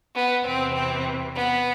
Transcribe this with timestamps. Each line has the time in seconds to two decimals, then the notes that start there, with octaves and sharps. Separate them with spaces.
0.14 B3
0.44 E2 C3 E3 C4
0.74 C4
1.34 B3